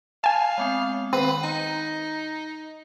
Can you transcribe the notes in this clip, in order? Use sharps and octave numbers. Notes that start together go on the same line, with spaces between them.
F5 G#5 A5
G#3 B3 C4
D#3 C4 B4 G5 D#7
D#4 A#5